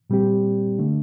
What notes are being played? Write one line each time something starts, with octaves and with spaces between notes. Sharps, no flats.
A#2 G3 C4 G4
D3 A3 D4